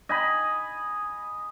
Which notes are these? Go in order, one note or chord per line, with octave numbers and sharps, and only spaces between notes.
D#5 G#5 B5